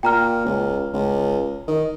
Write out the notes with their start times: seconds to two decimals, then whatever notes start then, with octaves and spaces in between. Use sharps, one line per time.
0.03 A#2 G5 A#5 F6
0.45 C#2
0.93 C#2
1.68 D#3